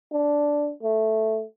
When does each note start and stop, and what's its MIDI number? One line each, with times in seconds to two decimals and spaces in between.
0.12 0.72 62
0.83 1.44 57